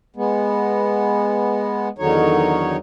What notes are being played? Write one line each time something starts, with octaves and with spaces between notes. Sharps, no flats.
G#3 B3
E2 D3 D#3 F#3 D#4 C#5